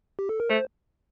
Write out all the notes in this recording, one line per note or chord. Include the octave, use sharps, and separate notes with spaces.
G4
A4
A#4
A3 C5